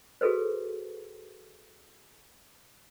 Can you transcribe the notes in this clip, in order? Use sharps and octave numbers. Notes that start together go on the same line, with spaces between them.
F#4 G#4 A4 B4 C5